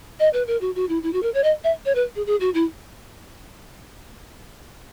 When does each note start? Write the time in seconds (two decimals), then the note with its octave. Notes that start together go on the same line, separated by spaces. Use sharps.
0.19 D#5
0.33 B4
0.47 A#4
0.61 F#4
0.75 F#4
0.89 E4
1.03 E4
1.13 F#4
1.23 A#4
1.34 C#5
1.44 D#5
1.64 E5
1.85 C#5
1.95 B4
2.16 G#4
2.26 G#4
2.40 F#4
2.54 E4